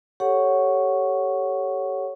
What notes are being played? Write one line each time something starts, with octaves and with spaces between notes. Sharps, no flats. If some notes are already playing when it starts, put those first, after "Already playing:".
G4 A4 C#5 F#5 C#6